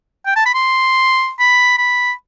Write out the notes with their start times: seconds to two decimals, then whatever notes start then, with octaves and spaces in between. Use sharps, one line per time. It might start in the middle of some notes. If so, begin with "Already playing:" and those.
0.26 G5
0.36 A5
0.46 B5
0.55 C6
1.40 B5
1.78 B5